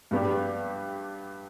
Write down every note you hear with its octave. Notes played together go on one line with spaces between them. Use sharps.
G2 G3 B3 G4